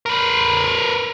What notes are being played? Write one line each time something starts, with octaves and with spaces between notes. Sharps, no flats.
A#4 B4